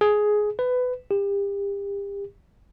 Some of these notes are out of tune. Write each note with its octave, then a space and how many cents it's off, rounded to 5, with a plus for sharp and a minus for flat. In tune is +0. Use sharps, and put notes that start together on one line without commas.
G#4 +10
B4 +20
G4 +35